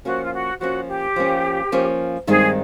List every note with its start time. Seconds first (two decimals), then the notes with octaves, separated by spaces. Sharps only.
0.05 F3 A#3 C#4 F#4
0.24 F4
0.33 F#4
0.60 F3 A#3 C#4 F#4
0.88 G4
1.16 F3 A#3 C#4
1.72 F3 A#3 C#4
2.27 G2 D#3 G#3 C4 D#4 G#4